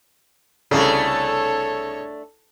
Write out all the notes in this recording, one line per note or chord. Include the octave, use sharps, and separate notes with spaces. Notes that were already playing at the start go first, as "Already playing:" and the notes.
C2 C#3 A3 D4 A4 C#5